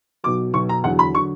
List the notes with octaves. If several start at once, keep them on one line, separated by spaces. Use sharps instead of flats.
B1 B2 F#3 D6
B1 B2 F#3 C#6
A#5
E2 D3 F#3 F#5
B5
D3 F#3 C#6